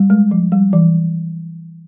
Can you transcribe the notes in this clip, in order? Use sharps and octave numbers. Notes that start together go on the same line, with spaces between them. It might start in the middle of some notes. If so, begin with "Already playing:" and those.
Already playing: G3
G#3
F3
G3
E3